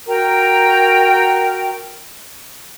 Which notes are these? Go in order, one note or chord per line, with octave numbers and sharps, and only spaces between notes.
F#4 A#4 G5 A#5